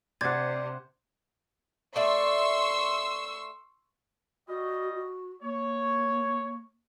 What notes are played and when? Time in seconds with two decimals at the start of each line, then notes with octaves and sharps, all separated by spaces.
0.21 C3 C5 D5 F#5 D6 G#6 A6
1.96 A3 D5 E5 C6 C#6 E6
4.48 G3 F#4 D#5
4.94 F#4
5.42 A#3 C#5